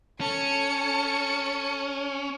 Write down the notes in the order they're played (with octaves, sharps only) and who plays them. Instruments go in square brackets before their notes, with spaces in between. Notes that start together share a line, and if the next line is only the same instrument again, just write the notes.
[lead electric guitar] C#4 [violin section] A4 A5 C#7